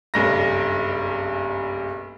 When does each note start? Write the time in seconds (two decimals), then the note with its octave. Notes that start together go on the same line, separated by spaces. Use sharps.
0.14 F#1 B1 G2 A#6